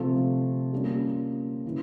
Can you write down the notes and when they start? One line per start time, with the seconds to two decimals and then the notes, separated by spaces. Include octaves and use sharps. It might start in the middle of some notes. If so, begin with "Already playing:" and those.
Already playing: C3 F3 A3 C4 F4
0.72 G3 A#3 C#4 F4
1.66 C#3 E3